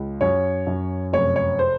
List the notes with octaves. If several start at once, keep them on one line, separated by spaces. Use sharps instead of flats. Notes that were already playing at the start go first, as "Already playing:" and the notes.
Already playing: C#2
F#2 C#5
F#2
F1 C#5
C#5
C5